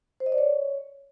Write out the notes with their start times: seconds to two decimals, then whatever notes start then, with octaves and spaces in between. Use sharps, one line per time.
0.20 C5
0.26 D#5
0.32 D5
0.38 C#5